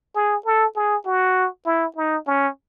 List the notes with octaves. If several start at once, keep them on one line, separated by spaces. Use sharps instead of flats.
G#4
A4
G#4
F#4
E4
D#4
C#4